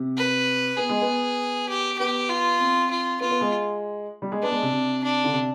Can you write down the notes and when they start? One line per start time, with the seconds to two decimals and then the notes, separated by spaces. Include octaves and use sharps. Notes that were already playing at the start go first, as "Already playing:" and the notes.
Already playing: C3
0.17 B4
0.77 B3 G#4
0.89 G#3
1.02 B3
1.69 G4
1.99 B3 G4
2.29 F4
2.59 C4
2.90 F4
3.21 B3 F4
3.31 B3
3.41 G#3
4.22 G3
4.32 G#3
4.43 B3 D4
4.52 G#3
4.62 C3
4.73 C3
5.04 D4
5.24 D3
5.33 C3